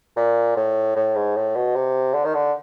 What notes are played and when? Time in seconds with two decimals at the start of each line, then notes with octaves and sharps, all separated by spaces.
0.16 A#2
0.56 A2
0.96 A2
1.15 G#2
1.36 A2
1.56 B2
1.75 C3
2.14 D3
2.25 D#3
2.34 D3